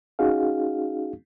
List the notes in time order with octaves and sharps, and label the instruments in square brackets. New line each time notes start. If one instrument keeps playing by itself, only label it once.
[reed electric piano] C#4 D#4 F#4 G#4 F5